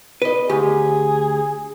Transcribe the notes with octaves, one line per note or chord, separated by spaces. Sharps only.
B4 D#5
D2 G4 G#4